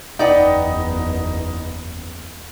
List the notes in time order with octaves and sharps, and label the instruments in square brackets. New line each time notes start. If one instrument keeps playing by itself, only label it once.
[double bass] F#1 E2 [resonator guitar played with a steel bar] B3 D5 G5 [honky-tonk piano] D#4